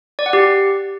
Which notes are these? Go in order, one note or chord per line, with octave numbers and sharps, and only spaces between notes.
D5
F#5
G4